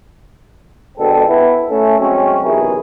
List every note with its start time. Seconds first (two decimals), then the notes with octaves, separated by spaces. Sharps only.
0.98 B2 D3 G#3 C4 A4
1.28 B3 E4
1.70 A3 C#4 A4
1.99 F#3 G#3 C4 C#4
2.43 B1 E2 C3 E4 G#4 A#4